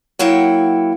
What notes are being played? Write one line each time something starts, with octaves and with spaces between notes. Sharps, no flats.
F#3 A#3 E4 F#5 G5